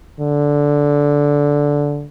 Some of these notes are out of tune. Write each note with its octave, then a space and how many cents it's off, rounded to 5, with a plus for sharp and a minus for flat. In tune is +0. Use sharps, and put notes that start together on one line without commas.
D3 -10